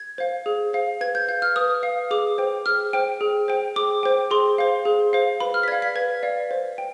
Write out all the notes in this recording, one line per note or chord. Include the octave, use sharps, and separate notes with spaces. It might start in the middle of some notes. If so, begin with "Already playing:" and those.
Already playing: G#6
C5 F5
G#4
C5 F5
B4 G#6
G6
F5 G6
F6
B4 D#6
F5
G#4 D6
C5 G5
G#4 F6
C5 G5
G#4
C5 G5
G#4 D6
C5 G5
G#4 C6
C5 F5
G#4
C5 F5
B4 B5
F6
B6
D5 F5 G#6
B6
B4 G#6
D5 F5
C5
G5